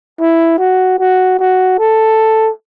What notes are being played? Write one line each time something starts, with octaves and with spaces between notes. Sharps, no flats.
E4
F#4
F#4
F#4
A4